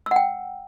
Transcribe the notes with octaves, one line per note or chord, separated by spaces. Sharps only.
F#5 G5 E6